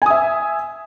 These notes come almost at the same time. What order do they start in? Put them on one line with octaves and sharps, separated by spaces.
G#5 D#6 E5